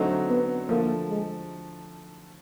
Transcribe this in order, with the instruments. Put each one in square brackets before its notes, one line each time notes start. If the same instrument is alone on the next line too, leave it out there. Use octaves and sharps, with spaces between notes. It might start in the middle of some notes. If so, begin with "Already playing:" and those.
Already playing: [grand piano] D3 F#3 A3 C4 D#4
[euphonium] B3
[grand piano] D3 F3 A3 [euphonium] A#3
[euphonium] G#3